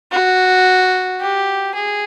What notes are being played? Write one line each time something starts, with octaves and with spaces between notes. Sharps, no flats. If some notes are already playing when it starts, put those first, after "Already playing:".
F#4
G4
G#4